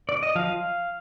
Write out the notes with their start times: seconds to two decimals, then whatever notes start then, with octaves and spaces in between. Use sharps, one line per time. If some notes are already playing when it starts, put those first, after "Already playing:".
0.09 D5
0.23 D#5
0.35 F3 F5